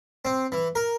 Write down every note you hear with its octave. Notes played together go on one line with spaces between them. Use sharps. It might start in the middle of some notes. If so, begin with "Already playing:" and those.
C4
E3
A#4